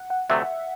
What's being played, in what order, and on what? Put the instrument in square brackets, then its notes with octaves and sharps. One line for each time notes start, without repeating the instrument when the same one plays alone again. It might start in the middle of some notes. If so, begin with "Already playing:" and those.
Already playing: [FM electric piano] F#5
F#5
[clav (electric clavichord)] D2 C3 F#3 A3 [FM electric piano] E5